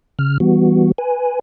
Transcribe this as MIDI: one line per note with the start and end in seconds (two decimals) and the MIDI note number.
0.19 0.38 49
0.19 0.38 89
0.40 0.92 52
0.40 0.92 55
0.40 0.92 59
0.40 0.92 66
0.98 1.39 71
0.98 1.39 80